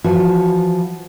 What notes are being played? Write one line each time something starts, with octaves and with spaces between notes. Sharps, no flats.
E3 F3 F#4 B4